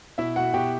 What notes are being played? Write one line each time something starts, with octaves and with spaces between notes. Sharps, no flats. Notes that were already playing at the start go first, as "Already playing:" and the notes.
B2 E4 E5
B2 F#4 F#5
B2 G4 G5